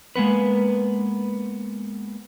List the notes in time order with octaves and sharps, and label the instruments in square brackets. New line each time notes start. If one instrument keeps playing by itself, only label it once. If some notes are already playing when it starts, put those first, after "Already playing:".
[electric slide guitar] G#3 A#3 B3 B4